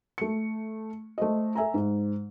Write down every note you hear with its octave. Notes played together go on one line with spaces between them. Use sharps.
A3 C#7
A3 C5 D#5
A4 E5 G#5 A#5
G#2